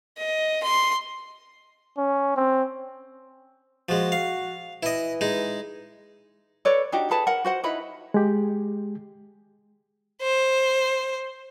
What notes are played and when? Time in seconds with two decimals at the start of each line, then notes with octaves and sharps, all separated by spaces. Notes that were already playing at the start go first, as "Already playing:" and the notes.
0.18 D#5
0.63 C6
1.98 C#4
2.36 C4
3.89 F3 G#3 F#4
4.12 F5
4.83 E3 E4 D#5
5.21 G#3 D#4
6.65 A4 B4 C#5 D5
6.92 D4 D#4 F#4 G4
7.11 G#4 A4 B4 A5
7.27 A#4 F#5
7.45 F#4 C5 F#5
7.63 D#4 E4 B4 B5
8.14 G#3 G4
10.22 C5